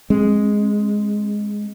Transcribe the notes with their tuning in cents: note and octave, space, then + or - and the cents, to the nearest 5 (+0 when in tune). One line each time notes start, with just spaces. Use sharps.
G#3 +0 C4 +45